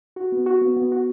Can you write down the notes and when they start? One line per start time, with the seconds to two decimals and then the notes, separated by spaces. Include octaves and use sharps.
0.16 F#4
0.32 B3
0.46 F#4
0.62 B3
0.77 B3
0.92 F#4